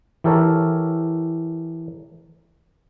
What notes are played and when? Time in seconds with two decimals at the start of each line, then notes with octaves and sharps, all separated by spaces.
0.24 E3 G4 A4 A#4 C#5